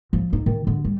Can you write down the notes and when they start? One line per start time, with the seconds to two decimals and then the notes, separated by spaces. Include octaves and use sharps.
0.13 F3
0.33 D#4
0.46 D#3
0.67 D3
0.85 G3